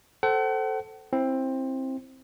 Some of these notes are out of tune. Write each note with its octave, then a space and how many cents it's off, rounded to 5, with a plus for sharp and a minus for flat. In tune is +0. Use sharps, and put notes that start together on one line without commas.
A4 +0 C5 +0 F#5 +40
C4 +15 E4 +0